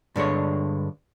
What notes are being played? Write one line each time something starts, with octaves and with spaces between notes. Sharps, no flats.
G2 D3 G#3 C#5